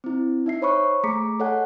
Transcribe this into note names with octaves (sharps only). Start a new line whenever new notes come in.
C4 E4
D#4 E5 C7
C5 C#5 B5 C#6 F#6
A3 G#4 A#5 D6 B6 C#7
A4 C#5 D#5 F#5 G#5 F#6